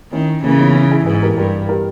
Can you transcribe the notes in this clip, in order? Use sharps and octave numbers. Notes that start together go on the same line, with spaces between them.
D#3 C#4 E4
C#3 E3 A#3 C#4
B3 D#4
C#4 E4
E4 G#4
G#2 G#4 B4
G4 A#4
G2 G4 A#4
G4 A#4